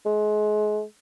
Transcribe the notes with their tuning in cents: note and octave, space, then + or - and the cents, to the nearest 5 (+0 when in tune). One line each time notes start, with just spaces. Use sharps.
G#3 +30